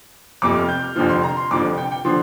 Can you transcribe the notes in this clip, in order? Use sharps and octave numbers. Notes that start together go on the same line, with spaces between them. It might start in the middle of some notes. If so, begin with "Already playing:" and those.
F1 F2 C3 D6
F6
G6
F6
F1 F2 D3 F3 F6
C6
A#5
C6
F1 F2 D3 F3 D6
G5
G5
D3 F3 C6